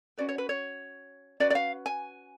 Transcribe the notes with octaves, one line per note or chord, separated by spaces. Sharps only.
C#4 F#4 B4 D5
C#5
B4
C#5
C#4 F#4 B4 D5
D5
F5
G#5